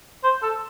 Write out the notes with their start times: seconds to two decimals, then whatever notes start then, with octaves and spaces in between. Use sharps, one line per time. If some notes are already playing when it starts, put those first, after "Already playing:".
0.24 C5
0.43 A4